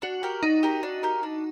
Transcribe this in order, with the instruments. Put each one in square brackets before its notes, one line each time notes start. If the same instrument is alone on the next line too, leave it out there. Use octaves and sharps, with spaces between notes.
[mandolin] D4 [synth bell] F#4
[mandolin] G4 A#4
[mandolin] D4 [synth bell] D#4
[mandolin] G4 A#4
D4
G4 A#4
D4